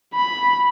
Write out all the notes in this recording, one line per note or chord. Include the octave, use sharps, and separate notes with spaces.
B5